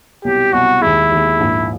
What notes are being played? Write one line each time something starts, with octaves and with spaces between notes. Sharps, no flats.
C2 B2 F#3 G4
C2 B2 F#3 F#4
D#2 D#3 G#3 E4
D#2 D#3 G#3
A#1 G#2 F3 A#3